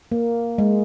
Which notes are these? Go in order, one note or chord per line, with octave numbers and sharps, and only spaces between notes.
A#3
G#3